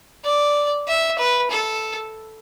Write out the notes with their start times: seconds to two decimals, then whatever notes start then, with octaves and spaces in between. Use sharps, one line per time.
0.25 D5
0.88 E5
1.19 B4
1.51 A4